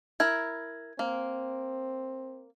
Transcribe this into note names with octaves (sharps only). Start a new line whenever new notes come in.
E4 A#4 G#6
A#3 C4